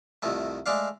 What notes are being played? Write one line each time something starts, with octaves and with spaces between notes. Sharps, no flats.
C2 F2 D#3 A3
G#3 A3 D4 D5 F5